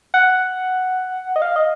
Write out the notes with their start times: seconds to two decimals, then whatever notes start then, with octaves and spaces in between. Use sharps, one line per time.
0.14 F#5
1.36 D#5
1.42 F5
1.56 D#5